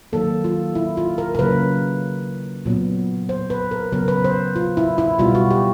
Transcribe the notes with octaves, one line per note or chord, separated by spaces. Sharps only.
D#3 F#3 A#3 A4
F4
E4
F4
A#4
A#4
C#3 F#3 A#3 B4
A#2 F#3 B3
C5
B4
A#4
C#3 F#3 B3 A#4
B4
C5
F4
E4
E4
B2 G3 B3 F4
F#4
G4